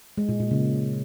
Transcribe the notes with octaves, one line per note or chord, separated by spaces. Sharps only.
G#3
A#2
A#2
C#3